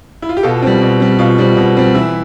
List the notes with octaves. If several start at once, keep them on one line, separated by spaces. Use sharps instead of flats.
E4
F4
G4
B2 F4 A4
G3 C4
B2
G3 C4
B2 F4
G3 C4
B2
G3 C4
E3 E4